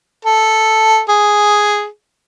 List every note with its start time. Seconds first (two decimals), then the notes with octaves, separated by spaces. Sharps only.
0.25 A4
1.09 G#4